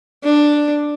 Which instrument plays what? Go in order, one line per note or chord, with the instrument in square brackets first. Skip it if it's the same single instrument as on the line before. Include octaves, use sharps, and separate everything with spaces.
[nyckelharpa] D4